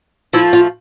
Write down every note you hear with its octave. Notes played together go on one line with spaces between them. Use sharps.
F3 A3 E4
F4